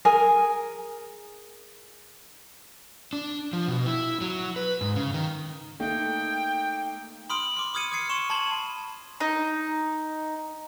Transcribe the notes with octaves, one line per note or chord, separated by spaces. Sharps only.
G#4 A#4 G#5
D4
F3
B2
E4
F#3
B4
G#2
C#3
D#3
A3 A#3 D#4 G5
B5 C6 D#6 F6 D7
C6 D6
D6 D#6 F6 G#6 C#7 D#7
D6 D#6 F6 G#6 C7 C#7
C6 C#6 E7
A5 B5 C6 G#6
D#4